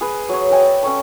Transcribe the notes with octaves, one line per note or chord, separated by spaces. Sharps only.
G#4 B4
F#3 C#5
D#5 E5 G5 G#5
D5
C#4 A4 C#5 A5